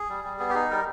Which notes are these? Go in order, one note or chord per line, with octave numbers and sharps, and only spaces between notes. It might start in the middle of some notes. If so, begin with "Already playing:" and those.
Already playing: G#4
G3
G3
B3 G#4
G4
D#4 G#4
G3 A#4